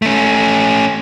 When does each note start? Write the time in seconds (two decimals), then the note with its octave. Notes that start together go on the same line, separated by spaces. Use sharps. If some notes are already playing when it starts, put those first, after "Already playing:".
0.02 A3 C#4